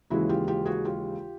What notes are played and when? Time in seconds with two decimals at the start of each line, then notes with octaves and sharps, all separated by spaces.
0.10 D#2 C#3 E3 G#3 E4 F#4
0.29 F4 G4
0.47 F4 G4
0.66 F#4 G#4
0.85 F4 G4